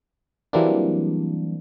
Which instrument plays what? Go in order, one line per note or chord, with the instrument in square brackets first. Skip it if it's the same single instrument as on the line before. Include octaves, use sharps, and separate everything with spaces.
[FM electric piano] E3 F#3 G3 A#3 C4 D4